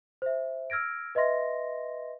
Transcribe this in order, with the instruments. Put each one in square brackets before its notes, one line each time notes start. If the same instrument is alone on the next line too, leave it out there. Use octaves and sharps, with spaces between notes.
[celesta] C5 E5
E6 F6 G#6 A#6 D7
B4 D#5 E5 C6 A#6